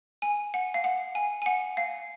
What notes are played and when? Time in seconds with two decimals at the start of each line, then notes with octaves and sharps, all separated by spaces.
0.22 G#5
0.54 F#5
0.74 F5
0.84 F#5
1.15 G#5
1.42 G#5
1.46 F#5
1.77 F5